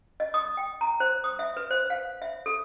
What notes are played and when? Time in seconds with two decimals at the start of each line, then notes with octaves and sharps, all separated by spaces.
0.20 D#5
0.34 D#6
0.57 G5
0.81 A#5
1.00 C5
1.24 D#6
1.39 E5
1.57 B4
1.71 C5
1.90 F5
2.22 E5
2.46 A4